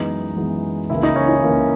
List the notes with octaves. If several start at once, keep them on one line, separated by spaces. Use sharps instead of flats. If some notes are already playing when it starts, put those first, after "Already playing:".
Already playing: F#2 E3 G#3 B3 D#4
F#2 E3 G#3 B3
C#2 C#3 E3 A#3 E4
D#4
C#4
D#4
C#2 C#3 E3 A#3